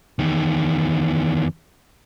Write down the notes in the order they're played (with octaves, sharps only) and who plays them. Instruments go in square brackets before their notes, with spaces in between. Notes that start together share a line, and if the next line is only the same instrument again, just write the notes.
[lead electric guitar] E2 D#3